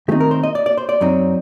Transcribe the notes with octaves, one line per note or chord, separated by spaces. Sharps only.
D#3 A3 C4 D#4 G4
A#4
C5
D#5
D5
D5
C5
D5
F#2 F#3 C4 D#4